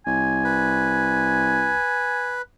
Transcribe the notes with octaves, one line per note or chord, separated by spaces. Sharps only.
C2 G#5
B4